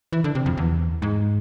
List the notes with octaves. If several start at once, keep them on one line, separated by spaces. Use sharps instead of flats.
E3
D3
C3
F2
E2
G#2